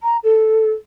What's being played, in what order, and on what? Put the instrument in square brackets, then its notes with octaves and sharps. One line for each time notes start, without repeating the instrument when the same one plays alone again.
[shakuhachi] A#5
A4